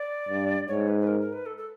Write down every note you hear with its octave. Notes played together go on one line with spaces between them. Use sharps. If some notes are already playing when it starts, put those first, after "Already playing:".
Already playing: D5
G2
G#2 C#5
B4
B4
A#4
A#4
B4
A4
A4